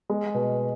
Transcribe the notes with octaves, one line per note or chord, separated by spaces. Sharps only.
G#3
B2